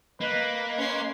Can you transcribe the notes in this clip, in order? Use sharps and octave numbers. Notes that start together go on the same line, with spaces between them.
A#3 B4 D#5
C#4 B4 C6